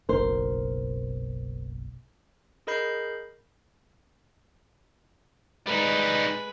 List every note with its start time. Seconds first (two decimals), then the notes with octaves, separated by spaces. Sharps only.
0.09 F#1 B1 B2 A#4 C5
2.67 G#4 A#4 D#5 B5 G6 C7
5.67 G3 G#3 D#4 B4